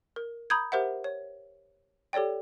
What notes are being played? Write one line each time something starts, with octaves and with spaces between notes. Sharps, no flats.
A#4
A#5 B5 D#6 G6 G#6
G4 A#4 C5 E5 F#5
C#5
G4 A4 C#5 D5 G5